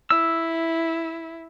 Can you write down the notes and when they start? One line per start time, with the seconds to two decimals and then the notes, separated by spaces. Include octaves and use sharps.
0.10 E4 E6